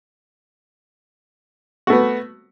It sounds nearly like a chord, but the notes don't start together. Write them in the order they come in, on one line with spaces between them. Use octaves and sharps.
F#4 A3 B3